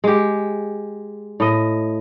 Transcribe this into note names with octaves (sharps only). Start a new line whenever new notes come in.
G#3 G4
A2 D#5